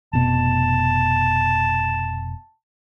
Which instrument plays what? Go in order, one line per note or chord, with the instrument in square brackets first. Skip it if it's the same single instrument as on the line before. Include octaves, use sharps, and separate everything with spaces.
[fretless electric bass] F1 B2 [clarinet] A5